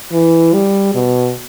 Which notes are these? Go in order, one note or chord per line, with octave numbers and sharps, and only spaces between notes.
E3
G3
B2